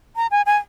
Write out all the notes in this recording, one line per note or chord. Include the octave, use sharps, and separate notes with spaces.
A#5
G#5
G#5